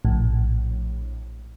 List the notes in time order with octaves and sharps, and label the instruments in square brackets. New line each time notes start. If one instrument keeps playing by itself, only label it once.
[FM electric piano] A#1 A2